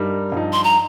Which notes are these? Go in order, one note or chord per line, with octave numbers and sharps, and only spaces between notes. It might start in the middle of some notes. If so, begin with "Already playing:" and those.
Already playing: G2 G3 D#4 A#4
G2 F3 D#4
C6
A#5